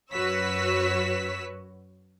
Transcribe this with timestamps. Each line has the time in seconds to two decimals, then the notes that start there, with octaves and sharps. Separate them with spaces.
0.13 F#2 F#4 B4 C#5 E6 B6